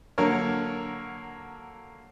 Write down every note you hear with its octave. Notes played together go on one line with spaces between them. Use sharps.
D3 F#3 A#3 A#4 C#5